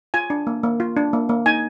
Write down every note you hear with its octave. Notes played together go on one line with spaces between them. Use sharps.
F4 G#5
D4
A#3
A#3
F4
D4
A#3
A#3
D#4 G#5